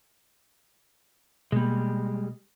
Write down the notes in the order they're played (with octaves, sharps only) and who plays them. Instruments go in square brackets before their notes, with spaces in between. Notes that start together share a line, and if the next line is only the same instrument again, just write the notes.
[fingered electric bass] B2 A#3 [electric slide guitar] G3 G#3